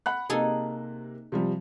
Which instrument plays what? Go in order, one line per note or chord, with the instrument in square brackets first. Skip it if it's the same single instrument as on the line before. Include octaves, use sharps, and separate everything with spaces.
[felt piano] F#5 B5 F#6
[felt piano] C3 A#3 [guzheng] D#4 G#4 A4
[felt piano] C3 F3 G3